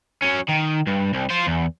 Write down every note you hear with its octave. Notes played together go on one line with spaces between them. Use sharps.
F#3 C#4
D#3
G2
C2
F4 C5
E2